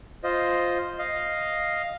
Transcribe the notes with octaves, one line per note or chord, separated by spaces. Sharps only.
F4 C5 D#5
D#5 F5